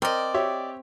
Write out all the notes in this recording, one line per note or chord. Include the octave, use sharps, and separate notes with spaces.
C4 A#4 D5 D#5
G4 C#5 E5